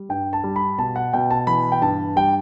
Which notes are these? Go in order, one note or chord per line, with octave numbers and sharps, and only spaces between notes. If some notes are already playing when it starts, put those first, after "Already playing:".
Already playing: G3
G2 G5
A5
G3
B5
B2 A5
F#5
B2 G5
A5
E3 B5
G5
G2 A5
G3 G5